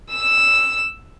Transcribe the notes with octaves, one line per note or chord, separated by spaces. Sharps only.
E6 E7